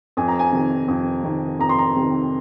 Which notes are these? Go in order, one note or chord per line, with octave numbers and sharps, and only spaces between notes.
F2 G#5
A#5
G#5
C3 D#3
F2
C3 D#3
F2 A#5
C6
A#5
C3 D#3